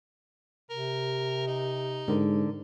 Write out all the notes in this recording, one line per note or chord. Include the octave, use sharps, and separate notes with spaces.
C3 A#4
D#4
G#2 D3 A#4